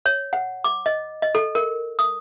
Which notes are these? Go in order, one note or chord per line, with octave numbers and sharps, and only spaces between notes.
C#5
F#5
D6
D#5
D#5
A4
A#4
D#6